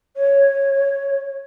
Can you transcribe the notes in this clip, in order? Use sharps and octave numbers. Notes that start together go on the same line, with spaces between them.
C#5